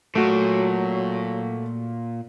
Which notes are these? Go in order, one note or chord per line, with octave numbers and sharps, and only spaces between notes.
A#2 F#3 A3 F#4